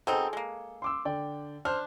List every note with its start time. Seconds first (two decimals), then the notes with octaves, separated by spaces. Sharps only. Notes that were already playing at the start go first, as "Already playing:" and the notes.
0.07 B2 C4 D#4 G#4 A4
0.33 G#3 A#3
0.82 C6 D6 E6
1.05 D3 D5 G5
1.65 D4 C5 F6